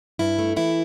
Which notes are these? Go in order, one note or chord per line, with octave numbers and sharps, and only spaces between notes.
G2 E4
A3
E3 E4